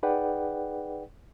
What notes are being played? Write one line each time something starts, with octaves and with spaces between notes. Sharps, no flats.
D#4 G#4 B4 D5 F#5 G5